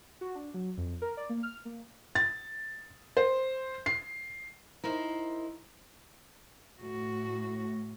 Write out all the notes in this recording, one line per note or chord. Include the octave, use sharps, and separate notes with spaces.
F#4
D4
F#3
F2
A#4
D5
A#3
F6
A#3
A6
C5
C7
D#4 E4 A#4 C5
A2 F#4